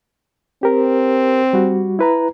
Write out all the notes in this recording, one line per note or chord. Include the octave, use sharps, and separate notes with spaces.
C4 G4 A#4
G3 F#4
E4 B4 A#5